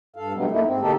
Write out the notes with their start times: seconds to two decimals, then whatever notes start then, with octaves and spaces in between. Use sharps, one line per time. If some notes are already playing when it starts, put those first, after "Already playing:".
0.16 G2 A4 F5
0.34 B2 D3 F#3 G3 A3 B3
0.51 F#2 A3 A#3 D#4 E4
0.66 G#2 C4
0.80 B2 D3 A#3 D#4 G4 A4